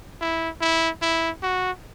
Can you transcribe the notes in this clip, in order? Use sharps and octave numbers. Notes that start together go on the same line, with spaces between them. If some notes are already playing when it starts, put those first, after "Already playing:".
E4
E4
E4
F#4